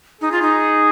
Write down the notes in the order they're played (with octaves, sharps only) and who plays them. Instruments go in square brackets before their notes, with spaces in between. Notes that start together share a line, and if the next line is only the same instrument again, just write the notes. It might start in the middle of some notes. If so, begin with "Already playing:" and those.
[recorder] D#4 [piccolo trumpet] G#4
[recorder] F4
D#4